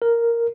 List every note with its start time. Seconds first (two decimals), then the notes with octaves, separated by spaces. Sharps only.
0.02 A#4